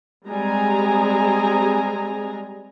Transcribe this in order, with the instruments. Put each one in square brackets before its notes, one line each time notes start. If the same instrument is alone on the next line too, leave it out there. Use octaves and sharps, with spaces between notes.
[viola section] G3 G#3 C4 G#4 G#5 A#5